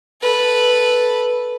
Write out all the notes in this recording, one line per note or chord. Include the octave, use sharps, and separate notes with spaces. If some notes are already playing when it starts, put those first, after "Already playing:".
A4 B4